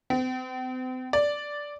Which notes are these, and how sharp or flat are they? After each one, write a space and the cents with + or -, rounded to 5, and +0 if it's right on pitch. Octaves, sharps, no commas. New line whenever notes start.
C4 -40
D5 -5